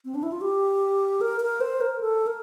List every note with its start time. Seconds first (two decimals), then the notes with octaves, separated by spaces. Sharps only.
0.05 C4
0.15 D4
0.23 E4
0.32 F4
0.41 G4
1.21 A#4
1.41 A#4
1.61 C5
1.81 A#4
2.01 A4
2.27 A#4